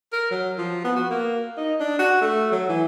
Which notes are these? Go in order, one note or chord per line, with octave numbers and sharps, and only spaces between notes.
A#4
F#3
F3
B3
F#4
A#3
D#4
D4
F#4
A3
F#3
E3